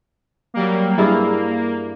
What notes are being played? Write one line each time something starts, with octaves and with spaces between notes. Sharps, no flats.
F#3 G3 A#3
G2 A#3 E4 G#4